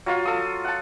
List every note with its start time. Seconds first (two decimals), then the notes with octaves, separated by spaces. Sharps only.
0.06 F#3 F4 F5
0.25 A4 D#6
0.65 F#5 A5